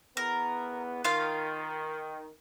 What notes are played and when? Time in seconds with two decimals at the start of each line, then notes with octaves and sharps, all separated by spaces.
0.17 E2 B3 A#4
1.04 D#3 F4 F5